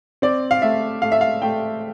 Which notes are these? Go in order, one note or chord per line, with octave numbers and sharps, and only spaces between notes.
C4 D5
F5
A3 E5
A3 F5
E5
F5
A3 G5